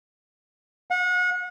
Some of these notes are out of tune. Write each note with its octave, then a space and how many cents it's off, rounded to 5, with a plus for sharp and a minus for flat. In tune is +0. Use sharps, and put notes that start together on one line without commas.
F#5 -35